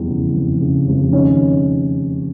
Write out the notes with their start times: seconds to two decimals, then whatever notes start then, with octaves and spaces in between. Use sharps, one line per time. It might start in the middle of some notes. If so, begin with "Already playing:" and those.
Already playing: F1 E2 G3
0.09 C#3
0.35 F1
0.61 C#3
0.87 F1
1.12 D#3 C#4 C#5